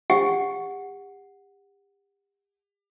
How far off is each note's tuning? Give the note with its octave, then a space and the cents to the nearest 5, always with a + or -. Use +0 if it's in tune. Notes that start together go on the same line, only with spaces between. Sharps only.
G4 +35 F#5 +0